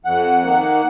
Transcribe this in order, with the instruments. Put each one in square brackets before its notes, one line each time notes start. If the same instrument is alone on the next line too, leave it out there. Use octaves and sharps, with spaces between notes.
[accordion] F2 F#5
D#3 A#3